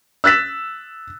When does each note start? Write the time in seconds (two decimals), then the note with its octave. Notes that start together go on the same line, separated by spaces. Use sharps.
0.24 E6 F#6 A6 B6 E7